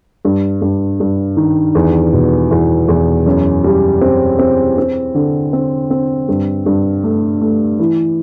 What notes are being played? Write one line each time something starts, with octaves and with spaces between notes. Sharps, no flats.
G2
G2
G2
D#3
E2
B2
E2
E2
F#2
G3
C4
C4
C4
D3
C4
C4
G2
G2
A3
A3
E3